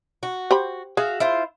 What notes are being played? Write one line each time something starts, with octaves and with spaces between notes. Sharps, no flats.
F#4
G4 C5 B5
F#4 G#4 E5 F5
E4 F4 C5